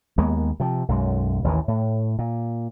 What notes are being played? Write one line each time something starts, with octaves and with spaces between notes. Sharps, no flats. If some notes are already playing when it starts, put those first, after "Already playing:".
D#2 G#3 A#3 B3
C3 F3
B1 F#2 G#3
A1 D#2 D#3 E3
A2
A#2